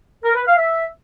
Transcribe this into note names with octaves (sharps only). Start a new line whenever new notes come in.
A#4
B4
F5
E5